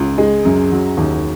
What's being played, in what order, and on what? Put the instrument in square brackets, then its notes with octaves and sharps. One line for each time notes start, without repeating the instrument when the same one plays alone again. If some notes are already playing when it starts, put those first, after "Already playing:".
Already playing: [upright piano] C#2
G#3
F#2
F#3
D#2